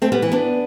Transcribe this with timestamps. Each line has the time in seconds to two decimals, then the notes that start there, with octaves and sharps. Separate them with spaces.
0.02 A3 C4
0.12 G3 B3
0.22 E3
0.32 B3 D4